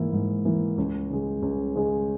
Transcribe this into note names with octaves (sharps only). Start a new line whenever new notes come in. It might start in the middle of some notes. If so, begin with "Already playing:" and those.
Already playing: G#2 E3 A#3 E4
G#2
E3 A#3 E4
C#2
C#3 G#3
C#2
C#3 G#3